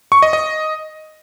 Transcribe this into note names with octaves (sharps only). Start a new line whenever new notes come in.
C#6
D#5
D#5